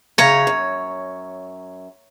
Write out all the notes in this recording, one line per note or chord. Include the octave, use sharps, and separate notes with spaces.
F#2 C#3 C#5 A#5
F#2